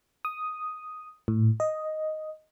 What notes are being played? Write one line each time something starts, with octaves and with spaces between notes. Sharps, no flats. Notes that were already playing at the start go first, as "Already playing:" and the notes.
D#6
A2
D#5